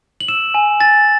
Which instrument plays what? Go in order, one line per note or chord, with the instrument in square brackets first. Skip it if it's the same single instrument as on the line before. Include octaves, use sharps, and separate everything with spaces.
[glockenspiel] F#7
E6 E7
G#5
G#5 A6